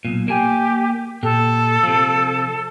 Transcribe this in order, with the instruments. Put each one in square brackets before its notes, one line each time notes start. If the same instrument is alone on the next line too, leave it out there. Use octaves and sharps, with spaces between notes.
[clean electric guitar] B1 A#2
[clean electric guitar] A#3 A#4 G#5 [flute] G4
[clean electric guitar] A#2 G4 [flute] A4
[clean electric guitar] C3 F3